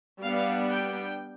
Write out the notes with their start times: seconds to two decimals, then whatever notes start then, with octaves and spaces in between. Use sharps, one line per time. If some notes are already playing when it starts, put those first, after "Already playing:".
0.21 G3 B3 D4 F5
0.70 G5